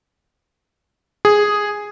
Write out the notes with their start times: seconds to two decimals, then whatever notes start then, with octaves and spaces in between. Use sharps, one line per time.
1.25 G#4